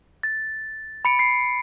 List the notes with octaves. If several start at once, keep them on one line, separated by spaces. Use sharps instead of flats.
A6
B5 C#7 D7
C7